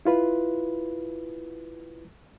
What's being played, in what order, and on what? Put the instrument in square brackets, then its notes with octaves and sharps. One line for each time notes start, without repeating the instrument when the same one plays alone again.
[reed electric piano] E4 F4 B4